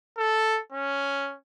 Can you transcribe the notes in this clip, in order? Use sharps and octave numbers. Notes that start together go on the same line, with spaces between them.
A4
C#4